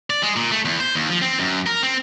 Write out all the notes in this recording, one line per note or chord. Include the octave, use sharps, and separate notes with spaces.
D5
G#3
A#2
A3
E2
C5
D#2
F3
C4
F#2
A#4
C4